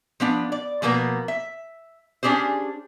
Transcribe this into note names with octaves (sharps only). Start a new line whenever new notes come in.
F3 B3 D4
D5
B2 F3 A#3 B3 A#4
E5
C#4 D4 G4 G#4 C5